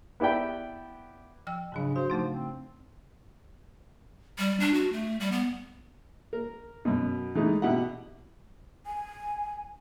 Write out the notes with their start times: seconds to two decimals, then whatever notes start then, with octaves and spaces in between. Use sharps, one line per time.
0.20 B3 E4 G4 D5 G5
1.47 F3 G5 E6
1.72 G#2 C#3 F#3 D4
1.96 F#4 C5
2.10 C#3 F3 A3 D#4
2.33 C4
4.38 G3
4.60 D4
4.74 F#4
4.92 A3
5.20 G3
5.32 B3
6.33 A#4
6.85 F#2 B2
7.35 E3 G#3 A3 D#4
7.62 B2 E4 G4 F#5
8.86 G#5